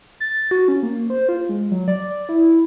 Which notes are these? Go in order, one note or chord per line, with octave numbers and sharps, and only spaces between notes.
A6
F#4
C#4
A#3
C5
F4
G#3
F#3
D5
E4